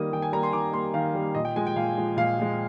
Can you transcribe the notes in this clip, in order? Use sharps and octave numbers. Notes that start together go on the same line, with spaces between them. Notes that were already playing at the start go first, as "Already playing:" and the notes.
Already playing: D#3 G3 A#3 D#6
D#3 G5
G#5
G3 A#3 A#5
C6
D#3 D6
G3 A#3 C6
D#3 F5
G3 A#3
A#2 D#5
G5
F3 G#3 G#5
G5
A#2 F5
F3 G#3
A#2 F5
F3 G#3